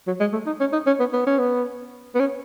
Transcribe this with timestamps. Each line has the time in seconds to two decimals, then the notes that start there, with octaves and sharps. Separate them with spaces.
0.07 F#3
0.20 G#3
0.33 A3
0.47 D#4
0.60 C#4
0.73 D#4
0.87 C#4
0.99 B3
1.13 B3
1.27 C#4
1.39 B3
2.15 B3
2.20 C#4